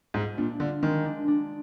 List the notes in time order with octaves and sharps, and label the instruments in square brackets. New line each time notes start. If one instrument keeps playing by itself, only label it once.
[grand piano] G#2 [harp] F4
[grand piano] A#2 [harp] D4
[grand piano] D3 [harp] F4
[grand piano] D#3 [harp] G#3
[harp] D4
D4